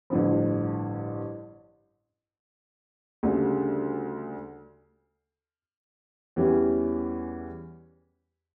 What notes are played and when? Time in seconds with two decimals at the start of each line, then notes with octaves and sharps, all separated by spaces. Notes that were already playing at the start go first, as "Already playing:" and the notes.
0.10 A1 G2 D3 F3
3.23 D2 C#3 G3 D4
6.36 E2 E3 G3 C#4 G4